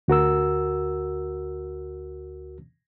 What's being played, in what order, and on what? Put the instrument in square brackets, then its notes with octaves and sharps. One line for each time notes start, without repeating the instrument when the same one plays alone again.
[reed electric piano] D2 F#4 A#4 E6